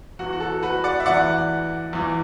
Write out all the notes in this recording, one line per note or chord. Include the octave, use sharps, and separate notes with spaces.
E2 E3 F#4
F#4
A4
F#4 B4
D5 F#5
E5
E2 E3 D5 F#5
E2 E3